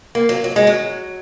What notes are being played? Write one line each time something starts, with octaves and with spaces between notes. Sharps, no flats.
A#3
F#3
F#3
G#3
F#3